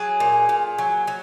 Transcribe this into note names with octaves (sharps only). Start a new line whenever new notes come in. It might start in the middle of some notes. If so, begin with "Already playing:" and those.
Already playing: F#3 G#4
A#2
A#2
F#3
F#3